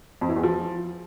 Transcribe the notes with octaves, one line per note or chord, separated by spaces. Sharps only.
F2
E3
E2
F3